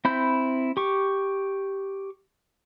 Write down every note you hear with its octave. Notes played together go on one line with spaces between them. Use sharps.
C4 E4 B5 G6
G4 C#6